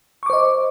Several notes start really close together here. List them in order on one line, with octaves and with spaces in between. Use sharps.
C#6 D6 C5 D#5